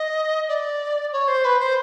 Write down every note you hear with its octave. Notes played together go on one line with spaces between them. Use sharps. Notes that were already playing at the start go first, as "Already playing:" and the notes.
Already playing: D#5
D5
C#5
C5
B4
C5